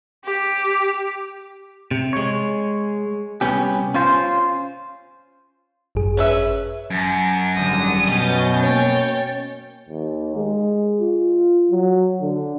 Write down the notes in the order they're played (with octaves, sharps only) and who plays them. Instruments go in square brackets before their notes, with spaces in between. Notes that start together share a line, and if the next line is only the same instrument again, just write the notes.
[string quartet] G4
[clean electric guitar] C3
G#3 C#5
C2 B3 C#4 G4
C#4 F4 C5
[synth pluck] G#1 F#2 G#4
[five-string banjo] C#4 B4 E5
[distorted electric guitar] F#2 [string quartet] A5 [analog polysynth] D7
[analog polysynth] G#1 D3 [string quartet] G3 D#6
[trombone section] B2 [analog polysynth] C#4 G6 A6
[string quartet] A#3 C#5 G5
[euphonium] D#2
G#3
F4
F#3
D3